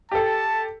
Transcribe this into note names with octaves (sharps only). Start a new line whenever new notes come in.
G4 A4 A5